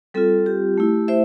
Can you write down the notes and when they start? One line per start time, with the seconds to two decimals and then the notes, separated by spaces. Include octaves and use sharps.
0.14 G3 C4 F4 A4
0.46 G4
0.78 A3 E4
1.08 C5 E5